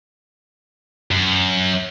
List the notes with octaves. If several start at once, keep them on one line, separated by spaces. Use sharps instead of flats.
F#2